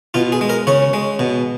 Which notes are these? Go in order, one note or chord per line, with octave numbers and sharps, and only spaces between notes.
B2 F4
G#4
G#3
A#4
C#3 C#5
G#3
B2